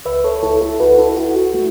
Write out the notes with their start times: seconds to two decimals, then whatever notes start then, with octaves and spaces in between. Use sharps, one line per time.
0.05 C#2 B4 E5
0.24 A4 C#5
0.43 C#2 E4 A4
0.61 E4 A4
0.80 C#2 F#4 B4
0.98 E4 A4
1.17 C#2 F#4
1.36 F#4
1.54 A3 E4